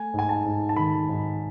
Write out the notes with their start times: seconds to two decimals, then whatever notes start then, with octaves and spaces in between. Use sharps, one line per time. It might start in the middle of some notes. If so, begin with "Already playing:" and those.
Already playing: A3 G#5
0.14 G#2
0.19 G#5
0.29 A5
0.45 G#2
0.69 A5
0.76 D#3 B5
1.09 G#2